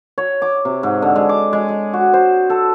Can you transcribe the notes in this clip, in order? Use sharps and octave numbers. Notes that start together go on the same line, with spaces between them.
C#5
D6
C3
G#2
D3
G#3
D6
G#3
G#3
F#4
C5
A4